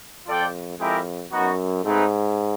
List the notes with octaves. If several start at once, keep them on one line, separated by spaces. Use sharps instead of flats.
F2 F4 A4 D5 G5
F2 G#3 C4 E4 G4 A#4
F#2 B3 D#4 F#4
G#2 A3 C4 D#4 G#4 B4